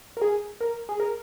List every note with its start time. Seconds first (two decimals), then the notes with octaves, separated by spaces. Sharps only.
0.17 A#4
0.21 G#4
0.61 A#4
0.89 G#4
1.00 A#4